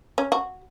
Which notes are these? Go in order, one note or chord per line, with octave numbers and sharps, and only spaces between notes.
C#4
F#4